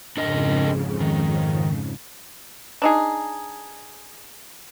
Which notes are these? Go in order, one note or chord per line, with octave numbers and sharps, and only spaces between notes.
F2 G#2 C#3 D4 A#4 D#5
D#3
D4 D#4 G#4